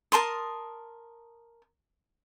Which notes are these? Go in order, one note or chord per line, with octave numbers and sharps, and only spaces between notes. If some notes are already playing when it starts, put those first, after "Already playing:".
A#4 A5 C6 D#6